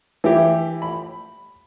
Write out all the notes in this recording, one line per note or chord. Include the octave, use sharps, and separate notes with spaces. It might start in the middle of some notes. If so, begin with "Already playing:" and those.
E3 E4 G4
B5